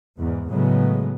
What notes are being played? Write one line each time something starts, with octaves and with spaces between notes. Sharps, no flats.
E2 G#2
A2 C#3 F#3 G#3 B3